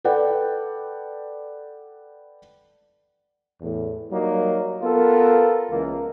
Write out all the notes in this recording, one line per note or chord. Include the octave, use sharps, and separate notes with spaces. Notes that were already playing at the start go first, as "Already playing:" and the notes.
A4 B4 D5 F#5 G5
E2 A2
F#3 G3 A#3 D#4
B3 F4 A4 A#4
C#2 E3 A#3